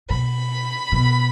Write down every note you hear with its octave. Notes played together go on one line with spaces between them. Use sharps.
B2 B5
B2